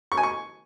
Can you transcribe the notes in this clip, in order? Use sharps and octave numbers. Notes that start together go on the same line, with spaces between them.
C#6
G#5
C#6